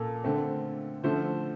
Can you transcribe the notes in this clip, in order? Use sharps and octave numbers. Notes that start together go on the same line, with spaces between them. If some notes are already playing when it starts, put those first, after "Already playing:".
Already playing: A#2 A#3 A4
D3 A3 C4
D3 F3 A3 C5